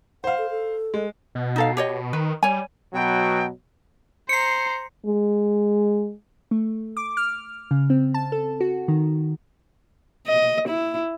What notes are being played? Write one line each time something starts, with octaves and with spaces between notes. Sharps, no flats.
C5 F5 F#5
A4
A4
G#3
B2
D#4 A4 F5
G4 C#5 D#5
D#3 B4
G3 C#5 G#5
B2 F#3 G5
C5 A#5 C7 C#7
G#3
A3
D6
F6
C#3
C4
A5
A4
F#4
D#3
D#5
E4